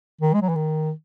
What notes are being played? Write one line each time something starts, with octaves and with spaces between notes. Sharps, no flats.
D#3
G#3
F#3
E3
D#3